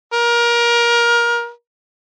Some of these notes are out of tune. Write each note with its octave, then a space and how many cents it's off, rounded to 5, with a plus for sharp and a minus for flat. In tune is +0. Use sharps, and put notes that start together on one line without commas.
A#4 +25